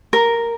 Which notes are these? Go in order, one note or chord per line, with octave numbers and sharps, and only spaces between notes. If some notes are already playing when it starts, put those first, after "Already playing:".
A#4